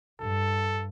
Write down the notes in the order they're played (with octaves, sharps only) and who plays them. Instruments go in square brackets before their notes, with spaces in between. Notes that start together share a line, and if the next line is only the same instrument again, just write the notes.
[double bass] G2 [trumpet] A4